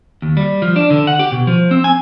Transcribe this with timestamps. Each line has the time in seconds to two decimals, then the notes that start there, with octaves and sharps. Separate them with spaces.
0.22 D#2
0.37 G3
0.62 F3
0.76 D4
0.90 D3
1.07 F#5
1.19 G4
1.32 B2
1.47 F3
1.71 C4
1.84 G#5